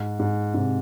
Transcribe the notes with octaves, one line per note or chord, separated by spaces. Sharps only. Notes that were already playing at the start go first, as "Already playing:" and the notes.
Already playing: G#2
G#2
G#2 C3